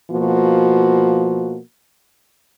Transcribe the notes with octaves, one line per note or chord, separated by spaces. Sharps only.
B2 F3 A#3 F#4